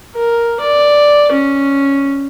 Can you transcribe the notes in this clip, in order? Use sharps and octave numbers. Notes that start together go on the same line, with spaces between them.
A#4
D5
C#4